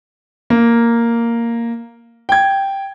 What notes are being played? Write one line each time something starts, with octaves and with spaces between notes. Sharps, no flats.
A#3
G5 G#6